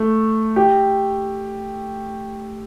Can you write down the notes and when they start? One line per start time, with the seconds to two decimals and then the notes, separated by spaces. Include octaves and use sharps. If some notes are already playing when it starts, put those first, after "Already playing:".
Already playing: A3
0.56 G4